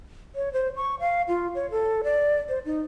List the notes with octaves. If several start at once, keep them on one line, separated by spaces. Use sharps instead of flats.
C#5
C5
C#6
F5
F4
C#5
A4
D5
C5
D#4